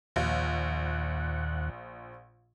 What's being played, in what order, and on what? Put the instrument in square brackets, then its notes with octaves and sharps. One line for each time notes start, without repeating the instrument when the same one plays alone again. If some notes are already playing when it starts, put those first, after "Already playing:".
[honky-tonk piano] A#1 [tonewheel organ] D#2 F#5